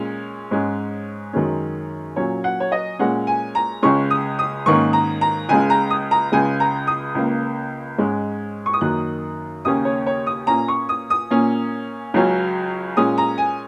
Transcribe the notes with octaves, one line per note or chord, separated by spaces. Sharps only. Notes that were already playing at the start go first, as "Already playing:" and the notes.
Already playing: A#2 G#3 C#4
G#2 G#3 C#4
F#2 D#3 G#3 C#4
A#2 F#3 C#4 C#5
F#5
C#5
D#5
A#2 G#3 C#4 F#5
G#5
A#5
C#2 C#3 G#3 C#4 C#6
D#6
D#6
G#2 D#3 A#3 C#4 C#6
A#5
A#5
C#2 C#3 G#3 G#5
A#5
D#6
A#5
C#2 C#3 G#3 G#5
A#5
D#6
C#2 C#3 A#3
G#2 G#3 C#4
C#6
D#6
F#2 D#3 A#3 F#6
D#2 C#3 A#3 C#4 D#6
C#5
C#5
D#6
A#2 A#3 C#4 A#5
C#6
D#6
D#6
A#2 A#3 C#4
C#2 C#3 F#3 C#4
A#2 G#3 C#4 D#6
A#5
G#5